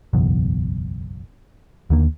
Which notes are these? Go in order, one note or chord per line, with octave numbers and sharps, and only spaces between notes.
F#1 B1 E2
D#2 D3 A#3